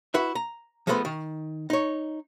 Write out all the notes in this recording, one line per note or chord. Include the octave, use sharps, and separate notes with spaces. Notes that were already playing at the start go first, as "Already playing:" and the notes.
E4 F#4 B4 E5
A#5
F3 G#3 A3 B3 B4 C5
D#3
D#4 C#5